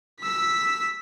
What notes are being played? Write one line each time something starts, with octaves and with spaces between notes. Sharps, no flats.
E6 B6